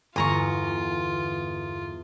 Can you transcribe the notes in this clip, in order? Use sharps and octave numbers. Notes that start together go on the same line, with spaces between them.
G1 E2 F4 G#5 A#5 C#6